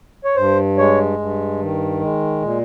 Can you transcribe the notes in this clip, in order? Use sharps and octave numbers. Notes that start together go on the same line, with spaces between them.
C#5
G2 C5
G#3 C#5
G2
D#3
G#3
A#2